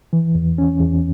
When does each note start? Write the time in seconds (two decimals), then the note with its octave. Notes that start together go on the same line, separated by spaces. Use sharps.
0.13 E3
0.35 E2
0.58 C#4
0.80 E2